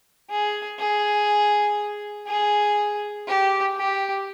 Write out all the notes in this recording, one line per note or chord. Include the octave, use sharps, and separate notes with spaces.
G#4
G#4
G#4
G4
G4